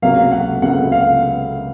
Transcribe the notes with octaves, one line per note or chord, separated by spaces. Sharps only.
C#2 C3 F#3 A#3 F5
F#5
C#2 C3 F#3 A#3 F#5
F5